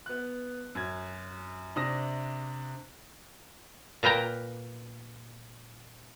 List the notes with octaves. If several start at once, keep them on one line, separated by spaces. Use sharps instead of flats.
B3 F#6
F#2 G#6
C3 D4 D#6 A#6
A#2 A#4 B4 G5 A#5